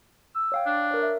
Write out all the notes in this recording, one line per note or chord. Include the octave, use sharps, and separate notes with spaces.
E6
C#5 F5 G5
D4
A#4 C#5
E5